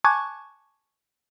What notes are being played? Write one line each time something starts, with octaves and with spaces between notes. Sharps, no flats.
G#5 A5 C#6 D6 F#6 G#6